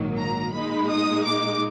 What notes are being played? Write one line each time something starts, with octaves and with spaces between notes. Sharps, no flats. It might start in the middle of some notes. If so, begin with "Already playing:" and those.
Already playing: A#1 G#2 D#3 F#3 A#3
A#5
A#2 G#3 D#4 B5
D#6
D6